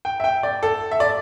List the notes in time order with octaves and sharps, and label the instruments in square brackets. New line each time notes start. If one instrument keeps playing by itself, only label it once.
[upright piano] G5
E5
G5
D5
A4
E5
D5